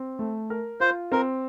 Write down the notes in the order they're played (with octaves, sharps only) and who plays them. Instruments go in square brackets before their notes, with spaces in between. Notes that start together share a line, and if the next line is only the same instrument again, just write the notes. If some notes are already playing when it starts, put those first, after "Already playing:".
Already playing: [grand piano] C4
A3
A#4
[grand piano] F4 [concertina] C5
[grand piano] C4 [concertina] A#4